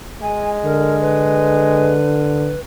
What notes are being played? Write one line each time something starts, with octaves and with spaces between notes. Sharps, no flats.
G#3 G#5
D3 A#4
B4